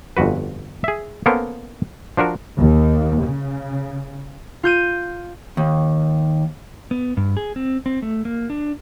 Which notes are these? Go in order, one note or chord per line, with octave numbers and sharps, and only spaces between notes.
G1 F2 F#4 B4
G#4 E5
A#3 B3 C#4 A4 A#4 C5
F3 D4 F#4 A#4
D#2
C#3
F4 G6 D#7
D#2
B3
G2
G#4
C4
C4
A3
A#3
D4